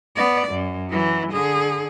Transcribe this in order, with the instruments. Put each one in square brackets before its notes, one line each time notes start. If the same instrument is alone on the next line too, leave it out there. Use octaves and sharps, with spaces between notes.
[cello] B3 D5
F#2
E3 F#3
D3 G#4